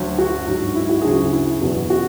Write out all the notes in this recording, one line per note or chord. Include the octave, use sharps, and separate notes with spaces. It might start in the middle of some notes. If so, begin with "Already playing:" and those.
Already playing: D2 D3 F#3
F#4
G#2 F#3
E4
F#4
D2 C#3 F#3 G#4
F#4
E4
E2 B2 F#3
F#4